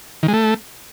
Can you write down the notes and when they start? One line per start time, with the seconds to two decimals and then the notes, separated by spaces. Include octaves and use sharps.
0.23 D#3
0.28 G#3
0.34 A3